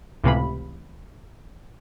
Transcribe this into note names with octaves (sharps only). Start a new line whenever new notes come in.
C#2 A2 C3 E3 F5 B5